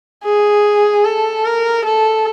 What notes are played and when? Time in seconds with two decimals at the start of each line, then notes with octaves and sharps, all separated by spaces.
0.24 G#4
1.05 A4
1.45 A#4
1.85 A4